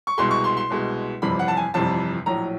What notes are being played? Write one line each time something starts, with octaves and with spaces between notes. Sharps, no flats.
C#6
C2 B2 G#3 C6
C#6
C6
C6
C2 B2 G#3
G1 F2 C3 E3 G3 B5
F#5
A5
G#5
G1 F2 C3 E3 G3 A5
A#1 A2 F#3 A#5